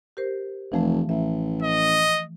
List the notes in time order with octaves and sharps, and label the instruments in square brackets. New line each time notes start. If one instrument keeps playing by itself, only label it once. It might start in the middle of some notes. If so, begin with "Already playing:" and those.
[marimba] G4 A#4 C5
[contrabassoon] F1 [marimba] E3 F3 A3
[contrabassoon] A1 [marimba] E5
[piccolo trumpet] D#5